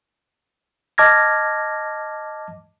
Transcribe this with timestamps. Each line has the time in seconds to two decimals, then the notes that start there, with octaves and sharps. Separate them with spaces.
0.98 D#5 A5 D6 F6 G#6 A#6